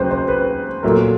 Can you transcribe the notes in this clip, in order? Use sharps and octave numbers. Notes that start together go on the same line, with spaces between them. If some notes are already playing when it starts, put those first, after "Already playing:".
Already playing: D#2 C#3 F#3 B4 C5
C5
B4
A#2 F#3 A3 A#4